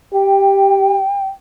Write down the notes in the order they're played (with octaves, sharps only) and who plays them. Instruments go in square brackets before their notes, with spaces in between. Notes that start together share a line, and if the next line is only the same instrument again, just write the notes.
[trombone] G4 [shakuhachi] G5